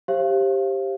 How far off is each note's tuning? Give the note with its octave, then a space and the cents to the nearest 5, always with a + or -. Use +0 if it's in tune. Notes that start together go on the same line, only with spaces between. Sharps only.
G4 +0 C5 +30 F5 -30